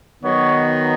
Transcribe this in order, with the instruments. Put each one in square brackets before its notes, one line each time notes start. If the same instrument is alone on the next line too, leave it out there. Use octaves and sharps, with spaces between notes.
[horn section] D#3 F#3 B3 D#4 C#5